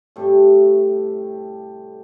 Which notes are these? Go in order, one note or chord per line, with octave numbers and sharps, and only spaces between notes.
A2 C3 G3 A4